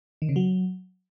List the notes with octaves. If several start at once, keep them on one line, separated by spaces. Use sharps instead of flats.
D#3
C#3
F#3